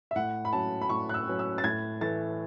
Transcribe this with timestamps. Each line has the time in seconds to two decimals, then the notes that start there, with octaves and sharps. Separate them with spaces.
0.11 E5
0.16 A2 F#5
0.45 B5
0.53 F#3 C#4 A5
0.81 B5
0.89 A2 C#6
1.09 F#6
1.14 E6
1.28 F#3 C#4
1.39 E6
1.58 A6
1.64 A2 G#6
2.01 E3 A3 A6